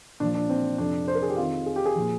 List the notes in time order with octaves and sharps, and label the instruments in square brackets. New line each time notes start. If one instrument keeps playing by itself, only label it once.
[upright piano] A#2 F3 D4
D4
C4
F2 C3 F3 D4
C5
A#4
G#4
G4
F2 D#3 F4
G#4
G4
G#4
A#2 F3